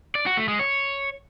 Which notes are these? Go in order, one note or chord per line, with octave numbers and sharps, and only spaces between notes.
D5
F#4
A3
G#3
C#5